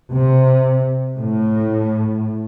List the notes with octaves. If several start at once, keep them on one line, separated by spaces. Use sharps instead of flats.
C3
A2